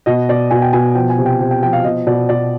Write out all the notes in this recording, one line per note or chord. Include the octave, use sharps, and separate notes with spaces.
B2 D#5
B2 D5
B2 G#5
G5
B2 G#5
F3 G5
G#5
C3
G5
C3 G5
G5
F3 G5
F5
B2 D#5
B2 D5
B2 D5